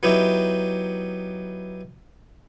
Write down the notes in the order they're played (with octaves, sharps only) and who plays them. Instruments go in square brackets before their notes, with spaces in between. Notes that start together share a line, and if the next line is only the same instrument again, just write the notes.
[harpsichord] F#3 B3 D#4 E4 G4